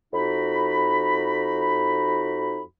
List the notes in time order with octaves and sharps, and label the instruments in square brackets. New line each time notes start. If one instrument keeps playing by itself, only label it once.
[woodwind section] F2 D#4 F#4 B5